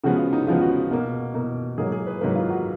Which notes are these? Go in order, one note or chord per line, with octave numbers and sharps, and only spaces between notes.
C#3 F3 G#3 B3 F#4
F4
D#4
C#3 F3 G#3 B3 F4
F#4
B2 A#3
B2 A#3
G#2 F#3 A#3 G#4
G#4
B4
G#2 F#3 A#3 B4
F4
F#4